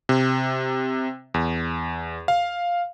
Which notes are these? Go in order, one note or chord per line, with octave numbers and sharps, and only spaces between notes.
C3
E2
F5